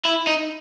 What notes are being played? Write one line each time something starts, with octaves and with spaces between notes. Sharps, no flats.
E4
D#4